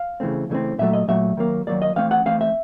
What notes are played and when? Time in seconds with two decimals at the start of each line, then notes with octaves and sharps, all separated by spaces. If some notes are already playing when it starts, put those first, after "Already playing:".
Already playing: F5
0.20 C#3 E3 A3 C4
0.49 C#3 E3 A3 C4
0.78 A#2 F#3 A3 E5
0.93 D#5
1.08 A#2 F#3 A3 E5
1.37 D#3 F#3 A#3
1.67 D#3 F#3 A#3 D5
1.82 D#5
1.96 E3 A3 C4 F5
2.11 F#5
2.26 E3 A3 C4 F5
2.41 E5